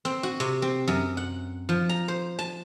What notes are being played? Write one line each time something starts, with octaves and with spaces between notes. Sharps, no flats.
C4
F#4
C3
C4
F#2
F#5
F3
A#5
C5
A5